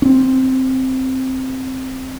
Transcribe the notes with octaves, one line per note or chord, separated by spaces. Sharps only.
C4 C#4